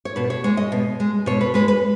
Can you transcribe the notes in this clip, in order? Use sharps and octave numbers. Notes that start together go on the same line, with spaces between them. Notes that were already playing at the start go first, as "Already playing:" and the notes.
C#5
B2 B4
C#5
G#3 C#5
D#5
B2
G#3
B2 C#5
B4
G#3 B4
B4